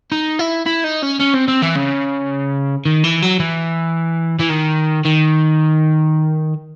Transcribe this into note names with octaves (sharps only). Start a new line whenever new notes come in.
D#4
E4
E4
D#4
C#4
C#4
C4
C4
E3
C#3
D#3
E3
F#3
E3
E3
D#3
D#3